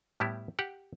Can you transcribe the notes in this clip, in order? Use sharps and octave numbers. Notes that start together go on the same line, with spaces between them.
A2 G3 B3 E4 G4
G4 F#5